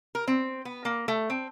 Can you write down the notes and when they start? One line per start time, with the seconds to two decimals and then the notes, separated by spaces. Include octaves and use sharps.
0.15 A#4
0.28 C4
0.65 B3
0.85 A#3
1.08 A3
1.30 C4